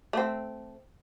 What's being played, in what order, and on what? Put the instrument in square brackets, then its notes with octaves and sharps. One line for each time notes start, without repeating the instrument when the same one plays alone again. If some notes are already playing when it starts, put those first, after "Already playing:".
[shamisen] A3 C4